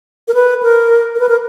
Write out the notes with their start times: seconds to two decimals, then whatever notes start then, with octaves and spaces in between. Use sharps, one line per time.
0.28 A#4
0.34 B4
0.63 A#4
1.15 A#4
1.20 B4
1.29 A#4